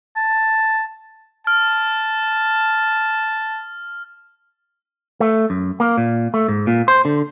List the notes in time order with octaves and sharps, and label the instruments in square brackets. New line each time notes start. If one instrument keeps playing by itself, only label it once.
[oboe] A5
[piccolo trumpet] A5 [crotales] F6
[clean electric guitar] A3
F#2
A#3
A#2
A3
G#2
A#2
C5
D3